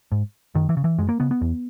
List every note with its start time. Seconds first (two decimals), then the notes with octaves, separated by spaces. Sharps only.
0.12 G#2
0.55 F#2 D#3
0.69 E3
0.77 C#3
0.84 E3
0.98 F#2 G#3
1.09 A#3
1.20 C#3 B3
1.31 B3
1.41 E2